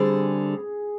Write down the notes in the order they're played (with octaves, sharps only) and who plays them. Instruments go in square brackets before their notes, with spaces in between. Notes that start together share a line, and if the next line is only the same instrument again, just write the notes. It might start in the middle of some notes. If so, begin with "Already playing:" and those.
Already playing: [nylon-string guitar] D3 G3 C4 [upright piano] G#4